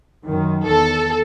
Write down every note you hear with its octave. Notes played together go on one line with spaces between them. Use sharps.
F#2 D#3
E2 A4